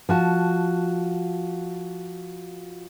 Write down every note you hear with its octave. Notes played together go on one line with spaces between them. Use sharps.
F3 F#4 A5